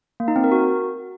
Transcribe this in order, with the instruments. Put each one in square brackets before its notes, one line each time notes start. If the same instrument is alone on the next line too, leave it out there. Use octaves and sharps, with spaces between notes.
[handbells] A#3
D#4
C4
A#4
F#4